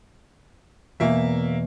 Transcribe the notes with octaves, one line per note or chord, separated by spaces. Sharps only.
E2 B2 A#3 E5